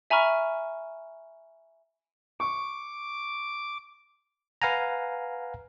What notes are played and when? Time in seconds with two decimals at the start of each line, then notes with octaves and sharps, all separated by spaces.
0.10 E5 G#5 A#5 B5 C#6 F6
2.40 C#6 D6
4.62 B4 F5 F#5 G#5 A#5